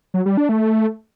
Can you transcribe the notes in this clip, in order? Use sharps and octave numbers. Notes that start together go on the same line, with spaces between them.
F#3
G3
D4
A3